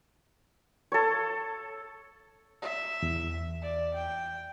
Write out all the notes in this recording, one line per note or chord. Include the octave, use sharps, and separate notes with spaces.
A4 C#5
E5
E2
D5
G5